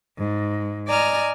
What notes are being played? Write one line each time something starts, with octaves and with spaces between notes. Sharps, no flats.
G#2
D5 D#5 G#5 A#5 F6